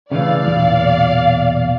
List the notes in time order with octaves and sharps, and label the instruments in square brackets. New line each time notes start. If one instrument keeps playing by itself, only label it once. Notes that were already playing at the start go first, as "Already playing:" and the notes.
[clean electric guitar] C#3 E3 A3 [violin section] D5 F5
[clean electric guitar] B1 E2 A#2